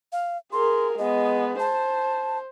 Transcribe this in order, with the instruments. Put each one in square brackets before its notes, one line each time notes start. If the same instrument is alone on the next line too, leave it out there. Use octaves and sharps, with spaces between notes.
[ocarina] F5
[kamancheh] G#4 A#4 [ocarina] C6
[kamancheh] G#3 B3 [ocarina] D#5
[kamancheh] C5 [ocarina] A5